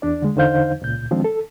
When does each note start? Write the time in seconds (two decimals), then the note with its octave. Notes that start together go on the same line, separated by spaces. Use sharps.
0.02 E2 D4 D5
0.22 D3 G#3
0.36 E2 D3 D#4 C5 F5 G6
0.82 C#2 A#2 G6
1.11 D#3 F3 G#3 C4 D4
1.24 A4